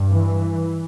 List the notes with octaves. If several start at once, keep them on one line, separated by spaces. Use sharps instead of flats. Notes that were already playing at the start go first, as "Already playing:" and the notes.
Already playing: G2
E3